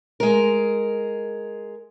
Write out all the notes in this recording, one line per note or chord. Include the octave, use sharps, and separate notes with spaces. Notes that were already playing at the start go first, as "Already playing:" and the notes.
G#3 A#4